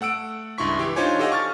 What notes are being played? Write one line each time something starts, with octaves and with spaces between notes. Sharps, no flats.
A3 F#5 E6 D7
C#2 G2 E4 C6 C#6 B6
E3 G4
D4 D#4 F4 C5 C#5 G#5
G4 A4 D#5 F5 F#5 G#5
C#6 F6 A6